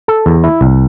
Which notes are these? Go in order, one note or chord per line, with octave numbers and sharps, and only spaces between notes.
A4
E2
E4
C2